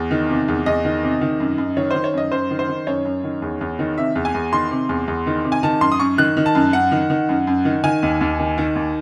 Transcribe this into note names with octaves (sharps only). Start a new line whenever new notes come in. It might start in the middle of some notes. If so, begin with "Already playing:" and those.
Already playing: E2
D#3
C3
E2
E2 D#5
D#3
C3
D#3
F#2
F#2
D#3 C#5
D#3 C5
C#5
F#2 D#5
F#2 C5
D#3
C5
D#3
F#2 C#5
F#2
D#3
E2
E2
D#3
C3 E5
E2
G#5
E2
D#3 C6
C3
E2
E2
D#3
C3
G#5
D#3 A5
F#2 C6
D#6
F#2 C#6
D#3 F#6
D#3
A5
F#2
F#2 F#5
D#3
D#3
F#2
F#2
D#3
D#3 G#5
D#2
D#2
D#3
D#3
D#2